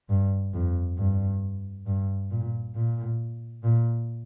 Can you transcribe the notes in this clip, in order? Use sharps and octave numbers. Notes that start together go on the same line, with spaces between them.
G2
F2
G2
G2
A#2
A#2
A#2